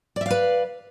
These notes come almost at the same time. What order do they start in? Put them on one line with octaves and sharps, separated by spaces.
D5 E5 F5 B4